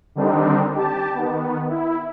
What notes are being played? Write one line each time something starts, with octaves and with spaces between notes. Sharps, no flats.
D3 D#3 G3 C4 D4 D#4
G4 A5
D#3 B3
E4